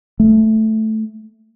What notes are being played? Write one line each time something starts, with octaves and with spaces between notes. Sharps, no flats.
A3